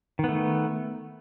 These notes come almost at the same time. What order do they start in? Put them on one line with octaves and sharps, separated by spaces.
D#3 B3 A3